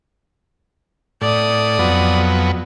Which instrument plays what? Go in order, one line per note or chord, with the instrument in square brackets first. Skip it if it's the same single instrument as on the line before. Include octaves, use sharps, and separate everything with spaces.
[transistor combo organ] A2 [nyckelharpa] D5 D#6
[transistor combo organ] F2 F#3 B3